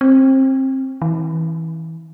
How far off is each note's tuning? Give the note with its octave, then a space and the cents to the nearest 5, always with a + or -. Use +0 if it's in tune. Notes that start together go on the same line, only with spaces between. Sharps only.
C4 +25
E3 -30